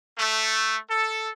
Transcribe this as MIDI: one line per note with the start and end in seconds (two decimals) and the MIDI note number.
0.19 0.78 57
0.91 1.29 69